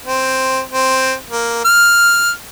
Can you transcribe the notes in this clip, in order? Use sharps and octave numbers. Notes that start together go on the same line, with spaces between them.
C4
C4
A#3
F6